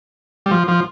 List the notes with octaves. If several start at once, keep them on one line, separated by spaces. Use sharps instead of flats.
G3
F3
F3